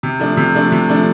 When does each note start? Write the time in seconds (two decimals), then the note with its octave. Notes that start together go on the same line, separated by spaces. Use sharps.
0.03 C3
0.20 F3 A3 D4
0.37 C3
0.55 F3 A3 D4
0.72 C3
0.89 F3 A3 D4